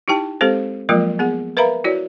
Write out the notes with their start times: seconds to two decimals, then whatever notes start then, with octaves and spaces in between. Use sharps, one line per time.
0.08 D#4 E4 G4 G5 A5
0.41 G#3 C4 G4 A4 C5
0.89 F3 F#3 G#3 A#3 F4 A#4
1.19 B3 G#4 F#5
1.57 A#4 B4 E5 F5 A#5 B5
1.84 E4 F#4 C#5 D5